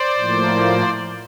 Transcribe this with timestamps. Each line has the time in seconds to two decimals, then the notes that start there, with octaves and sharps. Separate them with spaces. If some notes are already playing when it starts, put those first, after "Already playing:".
Already playing: C5 D5
0.18 A2 F3 A#3